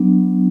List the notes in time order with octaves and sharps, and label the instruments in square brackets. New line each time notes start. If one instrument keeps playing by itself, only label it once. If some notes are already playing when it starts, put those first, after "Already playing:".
Already playing: [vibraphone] F#3 B3 D4